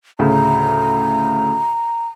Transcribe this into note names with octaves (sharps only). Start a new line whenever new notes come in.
D2 A2 C#3 A#5